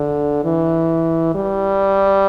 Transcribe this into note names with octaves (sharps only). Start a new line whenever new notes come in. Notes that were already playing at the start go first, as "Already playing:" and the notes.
Already playing: D3
E3
G3